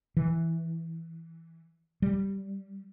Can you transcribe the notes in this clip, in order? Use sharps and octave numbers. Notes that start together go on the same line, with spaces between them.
E3
G3